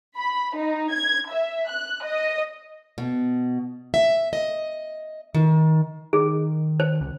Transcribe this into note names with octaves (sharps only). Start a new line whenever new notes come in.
B5
D#4
G#6
E5
F#6
D#5
B2
E5
D#5
D#3
D#3 G#4
C5
C#2